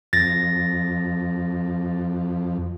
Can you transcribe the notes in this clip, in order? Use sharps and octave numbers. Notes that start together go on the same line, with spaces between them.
F2 A6 A#6